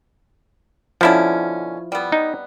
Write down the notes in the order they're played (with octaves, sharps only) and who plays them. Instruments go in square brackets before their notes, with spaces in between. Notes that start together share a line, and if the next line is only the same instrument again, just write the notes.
[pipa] B2 D3 C#4 [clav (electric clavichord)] F3 E4
[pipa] G3 B3
[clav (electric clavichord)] D#4